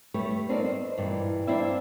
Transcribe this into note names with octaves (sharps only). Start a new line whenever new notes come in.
G3 A3 G4 B4 C#5
C4 D4 D#4 F4 A#4 D5
C5 D#5
G2 A#2 E3
A#3 C4 D4 E4 D5 E5